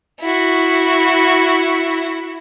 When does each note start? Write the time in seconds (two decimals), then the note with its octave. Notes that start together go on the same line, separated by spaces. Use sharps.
0.21 E4 F#4